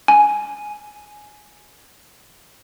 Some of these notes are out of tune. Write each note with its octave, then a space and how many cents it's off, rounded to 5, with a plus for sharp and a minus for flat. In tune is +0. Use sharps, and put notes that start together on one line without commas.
G#5 +10